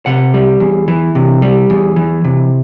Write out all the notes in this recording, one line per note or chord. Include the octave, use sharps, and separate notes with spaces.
C3 F#5
G3
E2
E3
C3
G3
E2
E3
C3